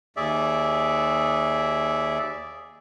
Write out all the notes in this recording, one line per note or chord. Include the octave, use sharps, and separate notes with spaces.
D#2 G#4 D5 E5